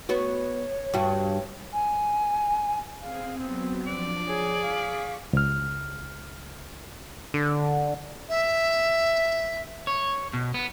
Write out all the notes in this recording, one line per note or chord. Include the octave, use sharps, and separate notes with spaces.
B3 F#4 C#5
G2 F#4
G#5
C4 G#4 F5
F#3 B3 C4
F3 D4 D5
F3 G#4 C#5
F5 C#6 D6 B6
C#2 F6
D3
E5
C#5
B2
B3